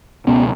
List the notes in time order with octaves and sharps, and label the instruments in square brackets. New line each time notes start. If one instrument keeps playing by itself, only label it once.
[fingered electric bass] C#2 B2 B3 C#4